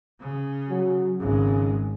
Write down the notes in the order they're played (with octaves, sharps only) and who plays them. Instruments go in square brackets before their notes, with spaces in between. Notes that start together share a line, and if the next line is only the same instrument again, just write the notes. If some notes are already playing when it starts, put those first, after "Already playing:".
[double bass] C#3
[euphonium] F#3
[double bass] G#1 G#3 [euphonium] C#3